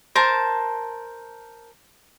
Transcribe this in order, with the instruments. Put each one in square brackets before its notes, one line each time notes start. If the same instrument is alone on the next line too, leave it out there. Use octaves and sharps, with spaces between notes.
[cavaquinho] A#4 C5 A5